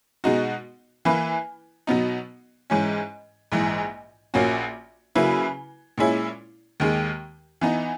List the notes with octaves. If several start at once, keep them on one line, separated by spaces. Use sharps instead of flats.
B2 G#3 D#4 F#4
E3 A#3 E4 B4
B2 F#3 B3 D#4
G#2 E3 G#3 C#4
A#1 G#2 E3
A#1 A#2 A#3 C#4 F#4
C#3 F#3 A#3 E4 B4
A#2 G#3 C#4 E4
D#2 D#3 G#3
E3 B3 D#4